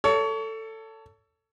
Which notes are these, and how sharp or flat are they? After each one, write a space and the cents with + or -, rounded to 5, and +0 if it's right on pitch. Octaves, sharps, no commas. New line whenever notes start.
A4 +15 C#5 +30